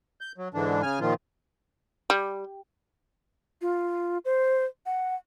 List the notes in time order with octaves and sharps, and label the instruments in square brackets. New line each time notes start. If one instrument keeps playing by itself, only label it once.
[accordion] G6
F#3
G#2 D3 E3 D4
C#3 G#5 F6
A#2 D#3 F3 F4
[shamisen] G3
[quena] F4
C5
F#5